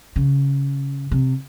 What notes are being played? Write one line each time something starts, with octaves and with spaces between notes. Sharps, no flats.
C#3
C3